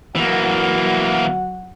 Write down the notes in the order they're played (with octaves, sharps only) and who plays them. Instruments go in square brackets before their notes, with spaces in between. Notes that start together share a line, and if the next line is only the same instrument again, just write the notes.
[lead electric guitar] E3 A#3 [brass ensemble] F#3 F#4 F#5